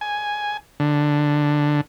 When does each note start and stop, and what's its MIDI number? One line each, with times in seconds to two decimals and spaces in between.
0.01 0.57 80
0.80 1.81 50